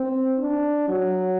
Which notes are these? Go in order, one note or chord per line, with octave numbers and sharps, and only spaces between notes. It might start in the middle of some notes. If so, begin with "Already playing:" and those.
Already playing: C4
D4
F#3